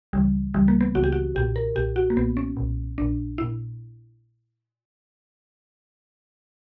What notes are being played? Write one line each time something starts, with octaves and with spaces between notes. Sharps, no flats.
C#2 C#3 E3 G3
C#2 C#3 E3 G3
A#3
B3
C#2 C#3 E3 F#4
G4
F#4
B1 A#2 G4
A#4
B1 A#2 G4
F#4
A#3
B1 A#2 B3
C#4
B1 A#2
A#1 A#2 D4
A#2 E4